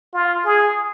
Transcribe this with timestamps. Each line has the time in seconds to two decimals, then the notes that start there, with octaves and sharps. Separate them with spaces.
0.14 F4
0.45 G#4